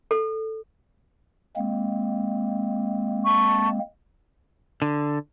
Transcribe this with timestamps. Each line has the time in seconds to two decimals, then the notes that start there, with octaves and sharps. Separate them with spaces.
0.11 A4
1.56 G#3 A#3 C4
3.25 A5 C#6
4.82 D3